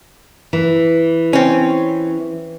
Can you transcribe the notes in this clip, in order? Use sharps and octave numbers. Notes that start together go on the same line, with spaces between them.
E3
C4 C#4